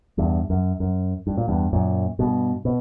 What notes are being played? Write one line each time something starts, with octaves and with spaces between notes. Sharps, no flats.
E2 G2
F#2
F#2
G2
A#2
E2 G2
F#2 A#2
G2 B2
B2